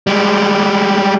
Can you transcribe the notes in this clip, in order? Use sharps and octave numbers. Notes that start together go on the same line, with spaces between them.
G3 G#3